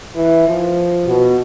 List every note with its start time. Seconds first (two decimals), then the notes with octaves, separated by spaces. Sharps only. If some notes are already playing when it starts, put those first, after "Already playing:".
0.16 E3
0.48 F3
1.06 B2